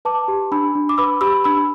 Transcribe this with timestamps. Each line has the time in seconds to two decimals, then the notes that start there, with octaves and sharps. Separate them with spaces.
0.05 B4 A5 D6
0.28 G4
0.52 D4 B5 E6
0.75 D4
0.89 D6
0.98 B4 B5 E6
1.21 G4 B5 E6
1.44 D4 B5 E6